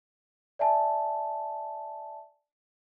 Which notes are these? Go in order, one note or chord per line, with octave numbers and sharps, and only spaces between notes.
D5 E5 G#5 A5